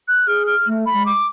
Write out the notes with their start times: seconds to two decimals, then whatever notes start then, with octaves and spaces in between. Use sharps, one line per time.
0.08 F#6
0.27 G#4 F6
0.47 F6
0.67 A3
0.86 B5
0.93 G#3
1.06 D6